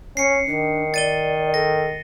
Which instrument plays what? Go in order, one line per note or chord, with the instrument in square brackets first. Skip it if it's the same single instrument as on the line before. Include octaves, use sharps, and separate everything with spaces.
[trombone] C#4 [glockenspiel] C7 C#7
[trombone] D#3 [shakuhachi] D4
[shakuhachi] D5 [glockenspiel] A6 D#7 G7
[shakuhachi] A4 [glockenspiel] A#6